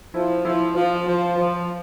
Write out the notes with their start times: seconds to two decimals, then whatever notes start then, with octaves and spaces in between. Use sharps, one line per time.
0.14 F3 E4
0.45 F3 E4
0.76 F3 F4
0.96 F4
1.06 F3 F4
1.38 F3